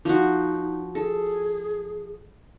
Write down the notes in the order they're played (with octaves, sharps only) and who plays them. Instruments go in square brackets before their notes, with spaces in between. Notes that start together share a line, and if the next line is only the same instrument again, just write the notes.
[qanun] F3 F#4 [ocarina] D#4
[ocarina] G#4 [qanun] A4